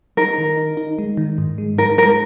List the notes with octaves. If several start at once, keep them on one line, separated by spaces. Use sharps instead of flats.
D#4 A#4
D#3
D#4
D#4
G#3
D#3
G#2
G#3
D#4 A#4
G#3 A#4